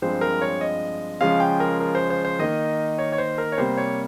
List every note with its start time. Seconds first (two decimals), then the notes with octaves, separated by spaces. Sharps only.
0.02 G2 F3 G#3 C4 C5
0.21 A#4
0.41 C#5
0.61 D#5
1.21 C#3 F3 G#3 C#4 F4 F5
1.40 G5
1.60 A#4
1.80 A#4
1.95 C5
2.10 C5
2.25 C5
2.39 D#3 A#3 D#4 D#5
2.98 C#5
3.12 C#5
3.18 C5
3.38 A#4
3.52 C#5
3.58 C3 G3 A#3 C5
3.77 C#5